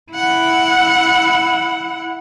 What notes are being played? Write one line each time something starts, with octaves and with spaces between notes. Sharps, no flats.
E4 F#5